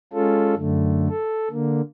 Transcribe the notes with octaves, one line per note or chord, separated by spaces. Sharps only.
G#3 C#4 F4 A4
F#2 D3 A3
A4
D3 A#3